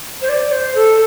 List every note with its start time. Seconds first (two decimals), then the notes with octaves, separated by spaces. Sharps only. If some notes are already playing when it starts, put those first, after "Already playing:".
0.21 C5
0.29 D5
0.52 C5
0.75 A4